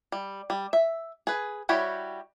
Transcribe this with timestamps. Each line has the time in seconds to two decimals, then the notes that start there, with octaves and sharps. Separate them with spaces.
0.12 G3
0.50 G3
0.73 E5
1.27 G#4 B4
1.69 G3 E4 F#4 G4 C#5